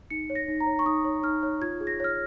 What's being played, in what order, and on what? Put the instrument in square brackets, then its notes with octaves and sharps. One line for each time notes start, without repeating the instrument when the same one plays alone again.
[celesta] D#4 C#7
C#5
A#6
D#4
A#5
C#5
C#6
D#4 D#6
C#5
D#4 F6
C#5
F4 G#6
G#4
A#6
C#5 F6